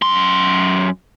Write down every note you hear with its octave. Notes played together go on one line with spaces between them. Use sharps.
F#2 C6